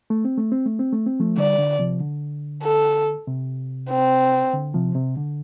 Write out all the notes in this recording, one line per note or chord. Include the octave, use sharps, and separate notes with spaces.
A3
C4
A3
C4
A3
C4
A3
C4
F3 A3
D3 G3 D5
D3
C3 F3
D3
A4
C3
C4
D3
C3 F3
C3
D3